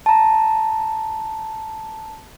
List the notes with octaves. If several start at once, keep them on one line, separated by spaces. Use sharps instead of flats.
A5 A#5